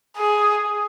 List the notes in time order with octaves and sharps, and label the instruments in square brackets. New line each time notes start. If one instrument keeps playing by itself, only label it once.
[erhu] G#4